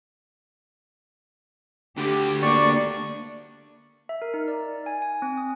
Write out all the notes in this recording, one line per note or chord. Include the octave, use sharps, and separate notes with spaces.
D2 D3 G4
A#3 D4 D5 C#6
E5
A#4
D#4
D5
G#5
G#5
C4
D#6